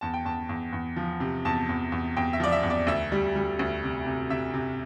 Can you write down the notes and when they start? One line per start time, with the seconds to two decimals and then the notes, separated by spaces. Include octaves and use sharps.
0.01 E2 A5
0.14 G5
0.25 E2 A5
0.49 E2
0.73 E2
0.96 F3
1.20 C3
1.45 E2 A5
1.69 E2
1.92 E2
2.17 E2 G5
2.33 E5
2.40 F3 D5
2.52 E5
2.63 E2
2.70 D5
2.87 D2 E5
3.12 G3
3.36 G3
3.59 D2
3.83 C3
4.06 C3
4.30 C3 E5
4.54 C3